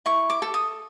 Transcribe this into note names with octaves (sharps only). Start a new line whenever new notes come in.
E4 C#6
D6
A4
D#6